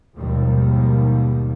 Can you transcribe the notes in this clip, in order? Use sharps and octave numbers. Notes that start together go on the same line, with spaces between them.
G#1 D#2 B2 D#3 F3 G3